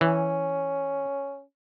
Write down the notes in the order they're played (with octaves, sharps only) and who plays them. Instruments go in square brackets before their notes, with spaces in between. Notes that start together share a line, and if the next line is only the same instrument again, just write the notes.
[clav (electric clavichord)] E3 [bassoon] C#4